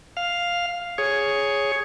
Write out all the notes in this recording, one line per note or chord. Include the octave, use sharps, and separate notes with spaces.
F5
G#4 C#5